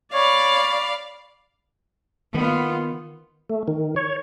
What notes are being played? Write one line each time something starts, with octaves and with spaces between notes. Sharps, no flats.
C#5 D5 F5 B5
D#3 B3 F4
A3
D#3
C#5